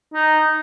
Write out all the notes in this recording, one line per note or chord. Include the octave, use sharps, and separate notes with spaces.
D#4